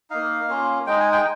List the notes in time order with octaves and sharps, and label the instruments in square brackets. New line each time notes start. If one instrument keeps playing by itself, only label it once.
[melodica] A#3 D#4 F5
A#3 C#4 F4
G#3 D#4 G5
G#5
G5